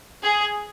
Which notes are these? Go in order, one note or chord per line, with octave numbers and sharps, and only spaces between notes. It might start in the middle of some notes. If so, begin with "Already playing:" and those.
G#4